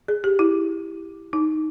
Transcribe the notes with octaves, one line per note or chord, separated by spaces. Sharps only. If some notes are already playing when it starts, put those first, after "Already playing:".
G#4
G4
E4
D#4